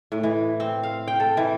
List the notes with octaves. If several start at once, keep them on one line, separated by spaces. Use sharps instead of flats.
A2
E3
C4
F5
G5
A4
E3